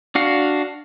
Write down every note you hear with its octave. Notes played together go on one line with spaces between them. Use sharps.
D4 F#4 F5